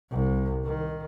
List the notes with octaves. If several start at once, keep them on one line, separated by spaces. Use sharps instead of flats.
C2
D#3